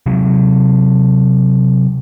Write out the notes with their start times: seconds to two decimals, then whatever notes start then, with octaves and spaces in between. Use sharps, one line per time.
0.06 C3 F#3